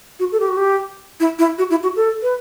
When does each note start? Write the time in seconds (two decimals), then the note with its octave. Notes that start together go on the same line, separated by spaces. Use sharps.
0.19 F#4
0.32 A4
0.40 G4
0.49 F#4
0.57 G4
1.20 E4
1.39 E4
1.58 F#4
1.70 E4
1.83 F#4
1.96 A4
2.22 B4